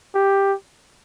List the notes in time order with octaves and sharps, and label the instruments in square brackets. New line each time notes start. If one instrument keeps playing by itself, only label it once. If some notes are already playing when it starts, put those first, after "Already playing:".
[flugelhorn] G4